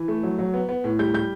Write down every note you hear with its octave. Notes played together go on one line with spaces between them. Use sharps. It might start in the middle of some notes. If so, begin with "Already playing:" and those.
Already playing: E3
A3
F#3
F#3
B3
B3
A2
G3 G6
G3 G6